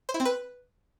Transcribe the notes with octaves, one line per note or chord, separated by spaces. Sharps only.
C5
E4
C4
B4